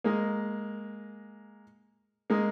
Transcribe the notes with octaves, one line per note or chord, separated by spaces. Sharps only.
G#3 A#3
G#3 A#3